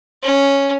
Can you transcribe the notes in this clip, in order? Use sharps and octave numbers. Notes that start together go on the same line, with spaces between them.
C#4